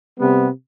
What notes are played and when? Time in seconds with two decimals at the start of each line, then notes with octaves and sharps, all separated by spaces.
0.19 C3 G3 B3